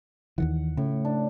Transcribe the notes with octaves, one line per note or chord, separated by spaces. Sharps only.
D#2 D#3 E3 F#5
A2 C#3
D4